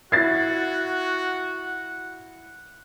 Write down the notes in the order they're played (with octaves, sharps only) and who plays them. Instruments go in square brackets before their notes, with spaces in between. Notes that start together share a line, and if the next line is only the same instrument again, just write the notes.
[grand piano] E4 C7 [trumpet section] F#4 [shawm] F#5 [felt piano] G#6 A6